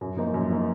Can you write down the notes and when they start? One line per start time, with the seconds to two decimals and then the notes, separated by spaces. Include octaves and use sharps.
0.01 F#2
0.17 F3 A#3 D#4
0.34 F#2
0.50 F3 A#3 D#4